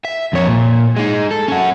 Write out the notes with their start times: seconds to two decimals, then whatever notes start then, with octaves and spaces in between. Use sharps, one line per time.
0.05 E5
0.33 F2 C#5
0.47 A#2
0.97 G#3 D#4
1.31 A4
1.48 C#4 F#4